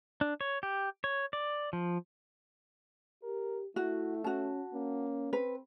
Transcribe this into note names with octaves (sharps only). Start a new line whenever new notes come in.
D4
C#5
G4
C#5
D5
F3
G4 A#4
A3 E4 F#4
C#4 F#4 A5
A#3 C#4
C4 B4